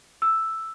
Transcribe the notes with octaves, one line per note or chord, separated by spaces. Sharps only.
E6